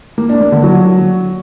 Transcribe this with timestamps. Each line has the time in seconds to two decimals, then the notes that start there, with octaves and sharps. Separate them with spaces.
0.18 A#3
0.29 D4
0.41 A#3
0.52 D3
0.64 F#3